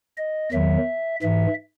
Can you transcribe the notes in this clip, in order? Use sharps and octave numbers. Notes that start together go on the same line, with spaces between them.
D#5
E2 D#3 F#3 E5
G#2 E3 E5